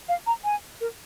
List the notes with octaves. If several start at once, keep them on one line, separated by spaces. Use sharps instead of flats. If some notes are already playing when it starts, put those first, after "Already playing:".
F5
A#5
G#5
A#4